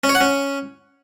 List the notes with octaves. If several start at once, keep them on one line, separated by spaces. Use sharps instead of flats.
C#4
C#5
F#5
C#4